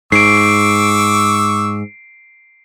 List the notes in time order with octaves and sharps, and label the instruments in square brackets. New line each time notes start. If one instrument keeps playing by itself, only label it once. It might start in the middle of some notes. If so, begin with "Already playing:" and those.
[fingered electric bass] G#2 [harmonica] C#6 D6 E6 [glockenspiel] C7 D7